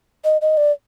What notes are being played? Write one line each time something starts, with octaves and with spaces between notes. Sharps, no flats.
D#5
D#5
D5